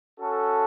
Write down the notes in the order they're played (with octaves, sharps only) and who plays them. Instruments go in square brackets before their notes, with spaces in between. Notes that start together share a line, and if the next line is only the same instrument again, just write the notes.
[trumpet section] C#4 F#4 A4